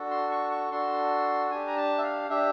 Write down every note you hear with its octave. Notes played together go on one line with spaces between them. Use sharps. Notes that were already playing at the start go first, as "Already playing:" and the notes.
Already playing: D4 F#4 A4
C6
C#6
C#6
D4 F#4 A4 C6
D4 G4 G#5
A#5
A5
E5
F5
D4 G4 E5